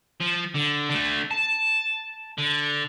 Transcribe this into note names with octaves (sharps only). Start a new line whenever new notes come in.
F3
D3
D3 A3
A5
D3